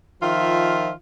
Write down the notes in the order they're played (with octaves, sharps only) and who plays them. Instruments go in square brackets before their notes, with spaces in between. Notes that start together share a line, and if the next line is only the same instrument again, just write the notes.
[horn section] D#3 F3 F4 E5